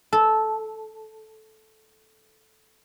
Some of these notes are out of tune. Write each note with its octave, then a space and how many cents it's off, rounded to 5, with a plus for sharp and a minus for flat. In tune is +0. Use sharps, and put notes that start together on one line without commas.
A4 -10